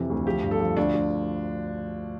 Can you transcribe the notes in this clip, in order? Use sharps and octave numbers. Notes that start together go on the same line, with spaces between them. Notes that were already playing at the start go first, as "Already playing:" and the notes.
Already playing: F2 C3 E3
D2
F3 G4
G2
A4
F3
D2 D4
D2